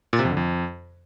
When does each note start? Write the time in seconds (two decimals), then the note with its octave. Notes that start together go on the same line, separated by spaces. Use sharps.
0.13 A#2
0.19 C3
0.25 F2
0.31 D3
0.37 F2